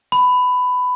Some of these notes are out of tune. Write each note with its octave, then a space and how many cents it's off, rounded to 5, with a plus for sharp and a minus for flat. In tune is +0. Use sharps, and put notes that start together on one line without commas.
B5 +15